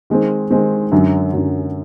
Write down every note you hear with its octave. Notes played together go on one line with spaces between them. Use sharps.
D#3 G#3 C4
D#3 G#3 C4
F#2 D3 F#3
F#2 D3 F#3